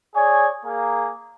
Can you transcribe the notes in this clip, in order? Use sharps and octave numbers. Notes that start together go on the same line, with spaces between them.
G#4 C#5 D5 G#5
A#3 G#4